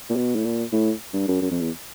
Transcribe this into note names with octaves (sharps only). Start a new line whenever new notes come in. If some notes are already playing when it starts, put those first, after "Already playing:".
A#2
B2
A2
A#2
A2
G2
F#2
F#2
F2
E2